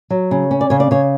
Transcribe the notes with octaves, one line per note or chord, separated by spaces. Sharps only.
F#3
C#3
C#4
D5
C#3 C#5
D5
C#3 C#5